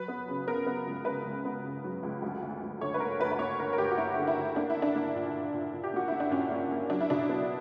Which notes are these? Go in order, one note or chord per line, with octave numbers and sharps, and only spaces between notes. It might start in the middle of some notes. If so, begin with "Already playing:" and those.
Already playing: F#3 B4
B3
C#3
B3 A#4
B3
C#2
C#3 B4
C#2
B3
C#3
F#3
C#2
D2
D2
D2
D3 C#5
B4
A#3 A#4
D2 B4
B4
A#3 C#5
D3 A#4
A#4
D2 G4
F#4
A#3 E4
D3
E4
D2
A#3 D4
E4
A#3
D4
A#3
A#2
A#2
A#2
A#2
G4
A#3 F#4
A#3 E4
D4
A#2 C#4
A#3
A#3
F#3 D4
E4
B2 D4
B3